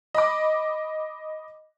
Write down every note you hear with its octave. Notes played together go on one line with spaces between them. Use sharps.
D#5 B5 D6